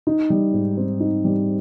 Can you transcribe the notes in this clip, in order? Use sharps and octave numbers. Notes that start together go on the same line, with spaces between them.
D#4
G3
G#2
C4
D#4
G3